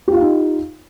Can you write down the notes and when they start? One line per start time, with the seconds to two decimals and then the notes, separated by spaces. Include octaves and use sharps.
0.08 G4
0.12 F4
0.16 F5
0.21 D#4